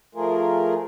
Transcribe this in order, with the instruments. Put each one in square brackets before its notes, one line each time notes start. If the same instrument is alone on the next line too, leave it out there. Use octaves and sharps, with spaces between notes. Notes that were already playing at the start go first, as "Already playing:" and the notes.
[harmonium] F3 A3 F4 G#4 A#4